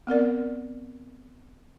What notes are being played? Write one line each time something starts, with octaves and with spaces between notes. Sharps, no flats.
B3 C4 A#4 D5